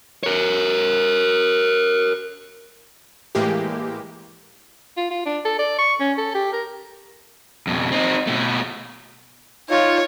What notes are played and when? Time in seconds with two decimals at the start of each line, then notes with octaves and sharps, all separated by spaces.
0.23 A#4 C#5
3.35 A2 E3 G#3 A#3 G4
4.97 F4
5.11 F4
5.26 D4
5.45 A4
5.59 D5
5.78 C#6
6.00 C#4
6.18 A4
6.35 G4
6.53 A#4
7.67 F2 B2
7.92 C4 D#4
8.27 B2 A3
9.70 D#4 F4 C#5